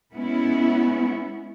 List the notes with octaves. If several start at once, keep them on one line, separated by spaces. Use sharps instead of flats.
G#3 B3 C#4 E4